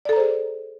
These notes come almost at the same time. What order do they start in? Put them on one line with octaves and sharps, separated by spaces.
D5 A4 A#5 C5 G#4